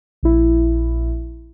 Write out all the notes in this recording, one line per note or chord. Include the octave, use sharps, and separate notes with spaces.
A#1 E4